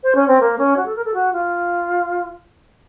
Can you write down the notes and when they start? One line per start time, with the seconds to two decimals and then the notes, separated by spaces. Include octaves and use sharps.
0.03 C5
0.15 C#4
0.27 C4
0.40 A#3
0.58 C#4
0.76 F#4
0.86 A4
0.96 A#4
1.04 A4
1.14 F#4
1.33 F4